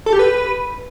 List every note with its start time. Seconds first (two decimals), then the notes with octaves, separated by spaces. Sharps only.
0.06 A4
0.13 G4
0.19 B4